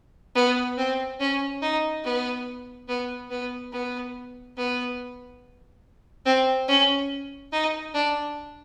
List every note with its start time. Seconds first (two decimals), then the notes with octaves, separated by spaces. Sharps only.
0.35 B3
0.77 C4
1.20 C#4
1.62 D#4
2.03 B3
2.88 B3
3.30 B3
3.72 B3
4.57 B3
6.25 C4
6.68 C#4
7.52 D#4
7.94 D4